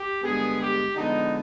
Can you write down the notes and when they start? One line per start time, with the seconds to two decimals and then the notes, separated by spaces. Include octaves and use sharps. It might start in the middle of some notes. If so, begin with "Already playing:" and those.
Already playing: G4
0.23 G2 D3 G#3 B3 G#4
0.61 G4
0.96 D3 F3 G#3 B3 D#4